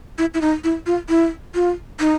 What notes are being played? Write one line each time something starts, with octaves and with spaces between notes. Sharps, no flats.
E4
E4
D#4
E4
F4
E4
F4
D#4